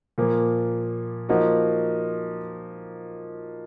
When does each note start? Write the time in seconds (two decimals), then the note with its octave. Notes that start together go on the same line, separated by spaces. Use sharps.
0.18 A#2 F3 A#3
1.29 F3 A#3 D#4 F#4